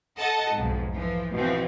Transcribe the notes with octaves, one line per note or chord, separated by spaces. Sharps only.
A4 D#5 F#5 A5
B1 F2 G#2
E3 F3
B2 E3 F3 C4